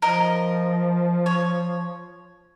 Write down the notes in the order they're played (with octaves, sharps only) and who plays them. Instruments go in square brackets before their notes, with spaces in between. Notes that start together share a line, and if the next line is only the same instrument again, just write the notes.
[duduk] F3 [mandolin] A#4 D#5
[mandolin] C#5